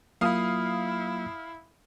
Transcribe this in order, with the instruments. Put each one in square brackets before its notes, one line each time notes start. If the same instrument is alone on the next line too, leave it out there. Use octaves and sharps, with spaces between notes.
[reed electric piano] F#3 A#3 F4 [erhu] E4 [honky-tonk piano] F5 D#6